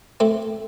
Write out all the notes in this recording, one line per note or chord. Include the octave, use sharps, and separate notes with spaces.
A3 C4